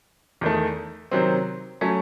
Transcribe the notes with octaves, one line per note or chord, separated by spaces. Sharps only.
E2 D#3 A3
C3 D#3 F#3 C4
F#3 A3 C#4